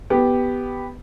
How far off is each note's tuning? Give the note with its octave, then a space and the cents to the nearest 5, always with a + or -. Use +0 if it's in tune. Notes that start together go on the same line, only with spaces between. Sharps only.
B3 +0 G4 +0